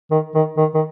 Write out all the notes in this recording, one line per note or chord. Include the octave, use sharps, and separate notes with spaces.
D#3
D#3
D#3
D#3